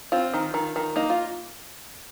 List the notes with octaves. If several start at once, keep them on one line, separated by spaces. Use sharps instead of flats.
C4 F4
D#3
D#3
D#3
A#3 D#4
F4